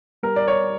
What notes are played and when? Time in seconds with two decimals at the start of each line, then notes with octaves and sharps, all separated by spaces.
0.23 G3 A#4
0.36 D5
0.48 C#5